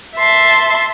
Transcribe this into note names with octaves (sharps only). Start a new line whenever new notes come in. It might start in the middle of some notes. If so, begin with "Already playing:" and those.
E5 A5 C6